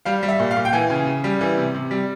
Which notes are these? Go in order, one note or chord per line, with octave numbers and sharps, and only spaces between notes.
G3 F5
G3
E5
A#2
F5
A#2
G5
E3 G#5
C#3
C#3
G3
E3
C3
C3
G3